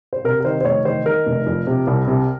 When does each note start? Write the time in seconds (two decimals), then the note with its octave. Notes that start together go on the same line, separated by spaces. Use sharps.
0.13 C5
0.24 C3 A#4
0.40 A#4
0.45 D#3 C5
0.61 C5
0.65 F1 C#5
0.85 D#3 C5
1.06 D#3 A#4
1.26 F1
1.46 F2
1.67 C3
1.87 C2
2.07 C3